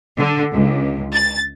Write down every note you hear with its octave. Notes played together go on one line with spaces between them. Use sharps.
D3
C#2
A6